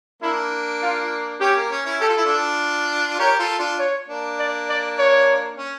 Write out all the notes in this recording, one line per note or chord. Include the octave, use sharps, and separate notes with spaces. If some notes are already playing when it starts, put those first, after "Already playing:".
A#3 D4 E4
F4
C#4 G4
A#3
C#4
C#4 E4
G4 A4
F4
E4
D4 F4
G4 A#4 C#5
F4 A4
D4 F4
C#5
A#3 D4
D5
D5
C#5
C#4